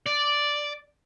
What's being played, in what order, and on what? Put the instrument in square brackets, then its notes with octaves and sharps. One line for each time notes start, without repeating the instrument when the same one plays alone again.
[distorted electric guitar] D5